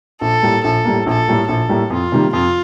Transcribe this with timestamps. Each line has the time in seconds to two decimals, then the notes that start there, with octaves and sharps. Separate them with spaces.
0.21 A#1 A4
0.43 A2 G3 A#3
0.64 A#1 A4
0.85 A2 G3 A#3
1.06 A#1 A4
1.28 A2 G3 A#3
1.48 A#1 A4
1.69 A2 G3 A#3
1.90 F2 F4
2.12 C3 D#3 G3 A#3
2.33 F2 F4